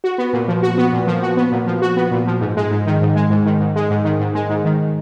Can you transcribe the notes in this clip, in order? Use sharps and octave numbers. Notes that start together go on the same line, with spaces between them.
F#4
B3
A#2
F3
F#4
B3
A#2
F3
F#4
B3
A#2
F3
F#4
B3
A#2
F3
G#2
G#3
G#2
D#3
G#2
G#3
G#2
D#3
G#2
G#3
G#2
D#3
G#2
G#3
G#2
D#3